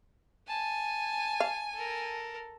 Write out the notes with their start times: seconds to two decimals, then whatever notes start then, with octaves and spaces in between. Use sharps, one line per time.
0.48 G#5 A5
1.40 F5
1.74 A4 A#4